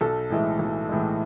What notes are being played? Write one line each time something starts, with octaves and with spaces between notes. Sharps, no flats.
B1 A4
A2 E3 G#3
B1
A2 E3 G#3